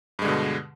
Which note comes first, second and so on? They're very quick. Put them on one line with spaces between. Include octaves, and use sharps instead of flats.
G2 G#3 D3 B2